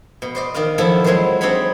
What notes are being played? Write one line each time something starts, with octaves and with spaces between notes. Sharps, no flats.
B2
C5 D5 D#5
D#3 D5 D#5 F5
D#3 F3 F#3 E4 A4
F#3 G#3 C4 E4 C5
C4 D4 D#4 C#5 B5